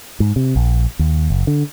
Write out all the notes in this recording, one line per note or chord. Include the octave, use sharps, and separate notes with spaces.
G#2
C3
A#1
D#2
F#1
D3